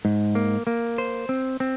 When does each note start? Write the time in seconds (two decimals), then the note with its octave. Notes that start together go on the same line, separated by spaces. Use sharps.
0.05 G#2
0.35 A#3
0.67 A#3
0.98 C5
1.29 C4
1.60 C4